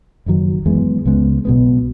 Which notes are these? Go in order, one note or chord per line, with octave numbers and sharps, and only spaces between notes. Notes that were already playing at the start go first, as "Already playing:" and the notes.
F#1 F#2 D#3 F#3
F#2 E3 G#3 B3
C#2 C#3 G#3 B3
B1 B2 G#3 B3